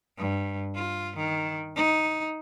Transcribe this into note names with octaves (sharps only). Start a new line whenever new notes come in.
G2
F4
D#3
D#4